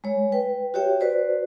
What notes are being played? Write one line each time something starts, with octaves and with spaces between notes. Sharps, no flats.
G#3 C#5
B4 G5
F#4 G4 C#5 E5 G5
F#4 B4 C5 D5